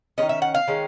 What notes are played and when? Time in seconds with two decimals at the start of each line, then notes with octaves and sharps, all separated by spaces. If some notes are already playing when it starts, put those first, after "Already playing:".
0.18 G#3 C#4 D#5
0.22 D#3
0.29 E5
0.42 F#5
0.54 F5
0.67 D#3 G#3 C#4